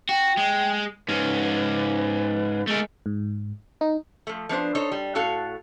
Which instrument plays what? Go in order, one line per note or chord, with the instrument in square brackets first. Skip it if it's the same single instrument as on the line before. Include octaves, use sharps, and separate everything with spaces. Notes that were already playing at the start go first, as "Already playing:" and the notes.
[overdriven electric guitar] F#4 [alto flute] G5
[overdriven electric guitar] G#3
[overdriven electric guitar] G#2 C#4 [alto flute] B4
[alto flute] G#3 [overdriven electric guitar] A3 A#4
[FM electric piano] G#2
D#4
[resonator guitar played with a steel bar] F3 A3
F3 B3 D4 C5
D#4 A4 C5 C#5
G3
A2 F#4 A4 F5